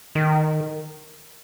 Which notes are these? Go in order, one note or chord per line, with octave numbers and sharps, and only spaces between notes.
D#3